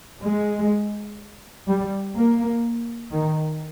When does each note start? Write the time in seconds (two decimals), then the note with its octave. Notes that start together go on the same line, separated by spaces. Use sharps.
0.23 G#3
1.68 G3
2.16 A#3
3.11 D#3